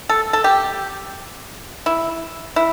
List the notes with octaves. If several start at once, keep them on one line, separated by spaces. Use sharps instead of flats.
A4
A4
G4
E4
E4